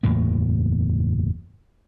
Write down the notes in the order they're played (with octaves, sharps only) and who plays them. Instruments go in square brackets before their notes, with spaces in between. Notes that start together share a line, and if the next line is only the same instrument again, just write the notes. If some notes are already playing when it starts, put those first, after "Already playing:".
[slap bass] F#1 E2 A2 A#3